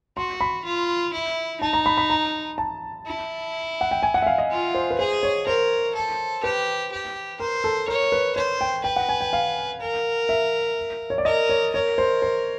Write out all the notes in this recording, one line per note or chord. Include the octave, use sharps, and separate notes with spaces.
F#4 C6
B5
F4
E4
D#4 A5
A#5
B5
B5
A#5
A5
E4
F#5
G5
G#5
F#5
E5
F5
D#5
F4
C5
B4
G#4 C5
C#5
A#4 C5
A4
G4 B4
G4
A#4 C5
A4
A#4 C#5
B4
C5 C#5
G5
B4 G5
F#5
G#5
G5
F5
A#4
E5
C#5
D5
A#4 D#5
C#5
A#4 C#5
C5
C5